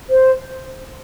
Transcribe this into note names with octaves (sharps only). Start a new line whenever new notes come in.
C5